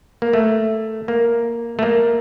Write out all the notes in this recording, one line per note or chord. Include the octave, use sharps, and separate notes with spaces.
A#3
A3
A#3
A3
A#3